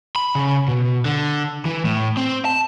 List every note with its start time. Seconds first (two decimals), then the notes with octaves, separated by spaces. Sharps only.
0.16 B5
0.35 C#3
0.68 B2
1.05 D3
1.65 E3
1.85 A2
2.17 C4
2.45 A5